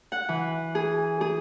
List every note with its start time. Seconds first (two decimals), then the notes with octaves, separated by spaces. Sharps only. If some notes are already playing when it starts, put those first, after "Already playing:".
0.12 F#5
0.29 E3
0.75 G#4
1.21 G#4